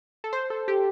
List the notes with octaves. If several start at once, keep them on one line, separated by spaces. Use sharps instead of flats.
A4
C5
A4
G4